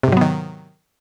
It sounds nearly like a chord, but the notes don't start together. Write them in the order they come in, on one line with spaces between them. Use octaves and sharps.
C3 G#2 F#3 B3 D#3